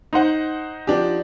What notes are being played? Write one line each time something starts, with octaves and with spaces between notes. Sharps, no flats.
D#4 C5 F#5
F3 D4 G4